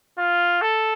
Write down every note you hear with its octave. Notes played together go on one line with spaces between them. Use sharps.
F4
A4